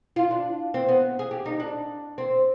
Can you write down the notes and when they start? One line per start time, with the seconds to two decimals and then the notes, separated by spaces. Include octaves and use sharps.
0.16 F4
0.31 D4
0.74 C4
0.88 B3
1.19 G#4
1.31 G4
1.46 D#4
1.60 D4
2.18 C4